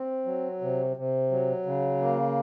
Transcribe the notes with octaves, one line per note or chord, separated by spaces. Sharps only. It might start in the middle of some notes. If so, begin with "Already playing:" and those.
Already playing: C4
F#3
C3
C3
F#3
C#3
A#3